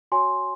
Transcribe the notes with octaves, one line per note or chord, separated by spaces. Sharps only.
F#4 C#5 G#5 C6